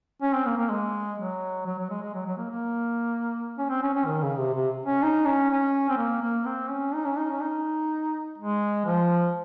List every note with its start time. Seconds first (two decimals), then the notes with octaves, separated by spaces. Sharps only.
0.22 C#4
0.34 C4
0.46 A#3
0.57 A#3
0.70 G#3
1.18 F#3
1.66 F#3
1.78 F#3
1.90 G#3
2.02 G#3
2.14 F#3
2.26 F#3
2.38 A#3
2.50 A#3
3.58 C#4
3.69 C4
3.82 C#4
3.94 C#4
4.06 D#3
4.22 C#3
4.38 C3
4.54 C3
4.86 C#4
5.03 D#4
5.26 C#4
5.51 C#4
5.89 C4
5.97 A#3
6.22 A#3
6.46 C4
6.70 C#4
6.94 D#4
7.06 C#4
7.18 D#4
7.30 C#4
7.42 D#4
8.38 G#3
8.86 F3